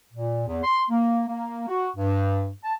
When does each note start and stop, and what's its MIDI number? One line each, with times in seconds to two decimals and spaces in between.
0.13 0.43 46
0.47 0.60 40
0.64 0.84 84
0.89 1.22 58
1.28 1.68 58
1.68 1.89 66
1.96 2.50 43
2.64 2.73 81